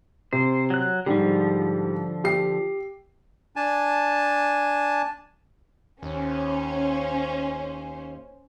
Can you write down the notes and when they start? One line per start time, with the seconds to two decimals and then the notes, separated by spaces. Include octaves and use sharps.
0.33 C3 C5
0.70 F#3 F#6
1.06 G#2 D3 F3 G3
2.24 G4 C7
3.56 D4 G#5 A5
6.03 D#2 C#4 C5